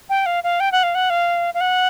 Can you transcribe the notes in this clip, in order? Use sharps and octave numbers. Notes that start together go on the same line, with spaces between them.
G5
F5
F5
G5
F#5
F5
F#5
F5
F5
F#5